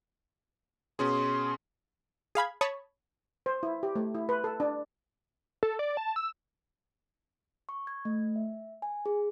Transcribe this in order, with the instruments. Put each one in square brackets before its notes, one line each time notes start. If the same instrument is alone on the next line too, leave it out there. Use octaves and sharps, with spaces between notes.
[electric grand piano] B2 C#4 G#4 [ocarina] C6
[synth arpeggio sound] G#4 F5 B5 G#6
C#5 A5 B5 C#6 D#6
[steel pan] C5
E4
G4
A3
E4
B4
A4
D4
[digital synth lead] A4
D5
A5
E6
[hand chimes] C#6
G#6
A3
E5
G#5
G#4